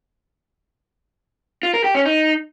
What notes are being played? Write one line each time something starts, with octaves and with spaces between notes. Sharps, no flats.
F4
A#4
G4
C#4
D#4